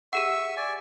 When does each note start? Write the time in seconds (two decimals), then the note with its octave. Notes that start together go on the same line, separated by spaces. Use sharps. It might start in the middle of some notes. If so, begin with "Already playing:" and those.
0.13 G4 G#4 E5 F#5 C#6 E6
0.57 D5 G#5